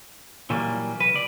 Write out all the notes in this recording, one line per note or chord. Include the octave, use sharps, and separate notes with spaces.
A#2 E3 F#3 G3 A#3
B1 B4
C#2 D5